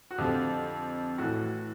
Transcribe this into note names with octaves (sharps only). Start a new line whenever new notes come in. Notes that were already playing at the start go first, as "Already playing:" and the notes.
F#4
F2 D3 F3 G4
A2 E3 F#4